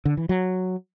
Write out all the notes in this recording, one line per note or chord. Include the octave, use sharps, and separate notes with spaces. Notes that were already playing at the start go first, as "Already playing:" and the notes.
D3
E3
F#3